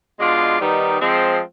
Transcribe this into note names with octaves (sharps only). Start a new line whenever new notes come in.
B2 G#3 D4 F4
D#3 G3 B3 D#4
F3 G#3 C4